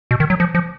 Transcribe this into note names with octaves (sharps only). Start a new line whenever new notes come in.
B2
D#3
F#3
F3
F3